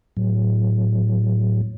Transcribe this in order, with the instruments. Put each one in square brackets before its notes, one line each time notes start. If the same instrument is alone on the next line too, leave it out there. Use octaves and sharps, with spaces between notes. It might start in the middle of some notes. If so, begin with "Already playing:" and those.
[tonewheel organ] A2 F#3